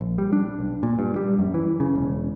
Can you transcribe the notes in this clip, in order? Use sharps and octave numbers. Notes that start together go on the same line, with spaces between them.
A#1
G3
D4
B1
A#2
G2
G3
F#2
E3
C#3
E1